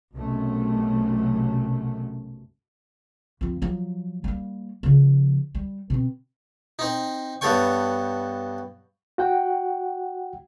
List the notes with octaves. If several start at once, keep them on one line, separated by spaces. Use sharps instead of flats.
B1 F#2 C3 A3
F2 F3
F3 F#3
G3 A#3
C#3 F3
G3
B2 C4
C4 D#4
G2 B3 A4 C#5 G5 C#6
F#4 F#5 G5